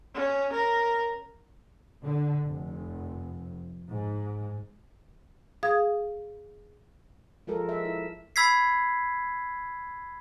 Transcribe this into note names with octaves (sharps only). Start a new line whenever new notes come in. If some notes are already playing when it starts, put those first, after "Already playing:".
C#4
A#4
D3
F1
G#2
G#4 F5 D#6 G#6
F3 G#3 F4 A4 A#4
E5
E4
B5 E6 G#6 B6 C7